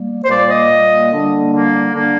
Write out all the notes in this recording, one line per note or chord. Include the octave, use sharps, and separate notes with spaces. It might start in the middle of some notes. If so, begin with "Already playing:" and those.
Already playing: G3 A#3
C5
A#2 G3 A#3 D5
D#5
A#2 G3 A#3
D3 G3 A#3
D3 G3 A#3
D3 G3 A#3